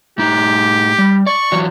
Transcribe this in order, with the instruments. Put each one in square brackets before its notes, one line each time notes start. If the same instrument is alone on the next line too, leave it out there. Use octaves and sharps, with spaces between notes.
[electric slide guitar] A2 D#4 [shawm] G4
[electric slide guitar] G3
[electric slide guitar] D5 [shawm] C#6
[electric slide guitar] E3 F#3 F#4